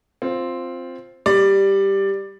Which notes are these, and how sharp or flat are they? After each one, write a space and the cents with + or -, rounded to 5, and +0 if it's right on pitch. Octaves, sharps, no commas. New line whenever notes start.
C4 +0 F4 +0
G3 +0 D5 +10